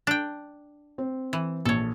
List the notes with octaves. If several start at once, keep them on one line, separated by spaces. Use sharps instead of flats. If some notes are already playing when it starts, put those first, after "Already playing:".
D4 G5
C4
E3
A#1 A4 C#5